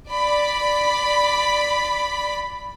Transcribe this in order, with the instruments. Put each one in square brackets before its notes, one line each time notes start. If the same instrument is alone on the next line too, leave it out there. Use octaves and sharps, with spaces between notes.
[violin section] D5 B5